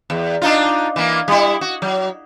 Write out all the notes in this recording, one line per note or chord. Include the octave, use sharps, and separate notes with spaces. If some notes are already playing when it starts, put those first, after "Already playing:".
E2
D4 D#4 F4
E3 A#3
G3 E4
F#4
F#3